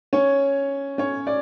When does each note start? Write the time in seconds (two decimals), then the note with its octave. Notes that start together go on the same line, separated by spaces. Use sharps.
0.13 C#4 C#5
0.98 C#4 C#5
1.27 D5